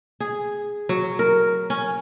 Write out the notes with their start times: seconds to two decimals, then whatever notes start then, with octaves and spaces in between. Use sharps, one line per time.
0.20 G#4
0.89 F#3
1.19 A#4
1.70 C#4